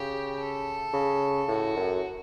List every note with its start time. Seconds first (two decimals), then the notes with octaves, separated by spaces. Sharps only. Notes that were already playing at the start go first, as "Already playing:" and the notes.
Already playing: C#3 G4
0.40 A4
0.93 C#3
1.48 A2 F#4
1.76 F#2